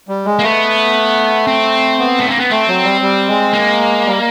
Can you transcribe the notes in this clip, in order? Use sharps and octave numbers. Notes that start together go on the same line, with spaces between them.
G3
G#3
A#3
A3 B3
C4
B3
A3
A#3
B3
A3 C4
F#3
G3
G3
G#3
A#3
G3